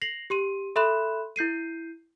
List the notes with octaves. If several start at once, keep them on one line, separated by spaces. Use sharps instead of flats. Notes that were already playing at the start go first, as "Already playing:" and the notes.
A#6 C7 F7 F#7
G4 C6 D#7
A4 E5 B5 C6 F#6 E7
E4 G6 C7 D#7